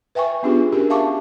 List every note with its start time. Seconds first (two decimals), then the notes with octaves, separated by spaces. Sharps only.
0.15 B4 E5 G5 G#5 C#6
0.43 B3 C#4 D4 F4 G4 G#4
0.72 C#4 D4 F#4 G4 A#4
0.90 E5 F5 A5 C#6 D6